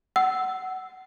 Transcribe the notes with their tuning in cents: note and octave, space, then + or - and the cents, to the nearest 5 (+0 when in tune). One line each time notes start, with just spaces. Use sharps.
F#5 +20 E6 +0